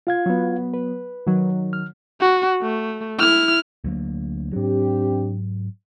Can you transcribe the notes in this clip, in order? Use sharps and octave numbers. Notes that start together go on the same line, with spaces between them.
F4 F5 G#6
F#3 B3
B4
D#3 F#3
F6
F#4
A3
E4 F6
D2 F#3 A#3
G#2 F#3 C4 D4 G4